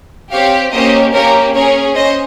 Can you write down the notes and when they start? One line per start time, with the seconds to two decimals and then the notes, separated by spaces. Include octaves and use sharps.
0.32 C4 G4 C#5 F5
0.73 A#3 C#4 G4 C5 D#5
1.14 A#3 C#4 G4 A#4 C#5
1.55 C#4 G#4 A#4 C#5
1.96 C#4 C5 D#5